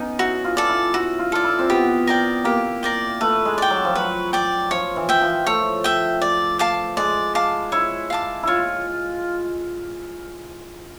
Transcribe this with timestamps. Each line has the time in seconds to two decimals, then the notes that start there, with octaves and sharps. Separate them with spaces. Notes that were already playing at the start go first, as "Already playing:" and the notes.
Already playing: B3 C#4 D#4
0.19 E4 F#4
0.45 F4
0.57 A4 D5
0.69 E4
0.94 E4 F#4
1.19 F4
1.32 F4 A4 D5
1.44 E4
1.59 C4
1.70 B3 G4
2.07 A#4 D5 G5
2.44 A#3 G4
2.83 A#4 D5 G5
3.21 A3 B4
3.45 G#3
3.58 D5 G5
3.70 F#3
3.85 F3
3.95 F#3 B4
4.33 D5 G5
4.71 F3 C#5
4.96 E3
5.09 E5 G5
5.21 F3
5.46 A3 C#5
5.84 E5 G5
6.22 D5
6.59 F5 A5 D6
6.97 G#3 D5
7.35 F5 A5 D6
7.72 E4 C#5
8.10 F5 A5 D6
8.43 E4 F4 C#5